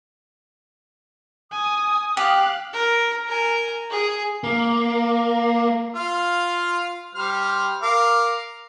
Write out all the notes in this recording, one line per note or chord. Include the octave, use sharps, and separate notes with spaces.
G#5 D#6
G4 F5 F#6
A#4
A#4 G#5
G#4
A#3
F4 F5
G3 C5 F6
A#4 F5 D6